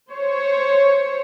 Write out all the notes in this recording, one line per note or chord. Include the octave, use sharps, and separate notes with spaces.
C5 C#5